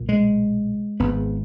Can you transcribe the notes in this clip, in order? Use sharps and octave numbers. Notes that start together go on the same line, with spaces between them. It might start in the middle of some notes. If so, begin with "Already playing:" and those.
Already playing: B1 A#2
G#3
G#1 G#2 B3